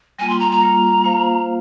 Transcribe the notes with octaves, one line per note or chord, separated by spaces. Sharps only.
G3 A#3 F4 G#5
C6
A#5
A#5
G3 A#3 F4
A#3 F4 C5 F5